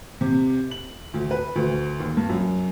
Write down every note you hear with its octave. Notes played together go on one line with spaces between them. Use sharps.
C3
F#7
D2
B4
D2
D#2
G2
F#2